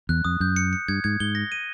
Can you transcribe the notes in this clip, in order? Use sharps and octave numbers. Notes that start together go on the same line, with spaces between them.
E2 F#6
F2 D#6
F#2 G6
C#7
C#7
G2 G#6
G#2 G#6
G#2 G7
A#6
D#7